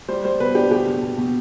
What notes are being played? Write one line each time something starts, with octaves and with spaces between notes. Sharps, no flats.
G3 C5
G3 C5
B2 B4
D4 G4
B2 G4
B2
B2
B2